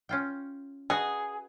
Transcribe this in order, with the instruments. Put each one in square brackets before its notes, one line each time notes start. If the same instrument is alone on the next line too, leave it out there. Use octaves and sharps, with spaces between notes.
[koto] C#4 F4 G5
[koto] F#4 B4 D#5 [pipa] G#4